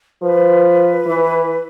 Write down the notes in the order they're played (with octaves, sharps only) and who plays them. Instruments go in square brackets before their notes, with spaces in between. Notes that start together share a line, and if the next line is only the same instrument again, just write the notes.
[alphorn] F3 [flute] B4
[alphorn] E3